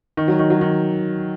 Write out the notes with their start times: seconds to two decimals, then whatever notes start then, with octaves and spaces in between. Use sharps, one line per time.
0.17 D#3
0.28 F#3
0.39 D#3
0.50 F#3
0.61 D#3